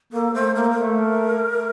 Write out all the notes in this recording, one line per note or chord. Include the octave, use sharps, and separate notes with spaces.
A#3 A4
A3 C5
A#3 A#4
A4
A#4
A3